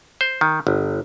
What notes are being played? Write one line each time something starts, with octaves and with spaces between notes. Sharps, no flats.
C5
D#3
G1